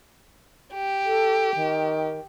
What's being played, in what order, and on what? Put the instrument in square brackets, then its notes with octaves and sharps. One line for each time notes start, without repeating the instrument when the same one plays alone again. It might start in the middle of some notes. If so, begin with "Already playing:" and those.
[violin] G4
[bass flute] A4
D#3